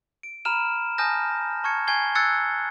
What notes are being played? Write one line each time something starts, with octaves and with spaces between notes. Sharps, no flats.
D7
A#5 B5 F6 D#7 E7
G#5 A5 D#6 F6 G6 A#6
A5 C#6 F6 G#6 C#7
G#5 C#6 G6 G#6 C7 G7
E6 F#6 G#6 A6 C7 C#7